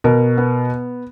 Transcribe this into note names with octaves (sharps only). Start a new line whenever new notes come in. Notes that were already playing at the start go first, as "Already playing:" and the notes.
B2 A#4
B3